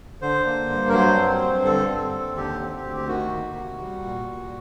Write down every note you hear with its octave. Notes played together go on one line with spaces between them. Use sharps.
D3 C5
A#3
G2
A#4
F#3 C5
C4
G2
D3 A4
C4
D#2
D3 G4
C4
D2
G4
D#3 F#4
A#3
C3
G3
A#2
A#2